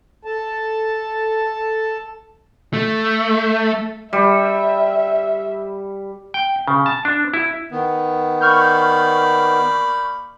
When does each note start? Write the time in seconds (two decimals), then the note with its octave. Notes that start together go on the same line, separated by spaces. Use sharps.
0.25 A4 A5
2.74 A3
4.13 G3 E5
6.34 G5
6.68 C#3
6.86 A5
7.05 D4
7.34 E4
7.72 D#3 B3
8.41 A#3 D5 B5 C#6 F6 G6